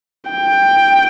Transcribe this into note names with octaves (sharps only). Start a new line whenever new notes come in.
G5